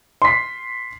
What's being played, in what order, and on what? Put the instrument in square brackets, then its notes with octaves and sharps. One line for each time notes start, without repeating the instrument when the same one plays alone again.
[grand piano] C6 B6